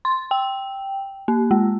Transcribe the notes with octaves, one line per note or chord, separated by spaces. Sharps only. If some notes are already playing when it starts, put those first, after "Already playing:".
C6
G5
A#3
G#3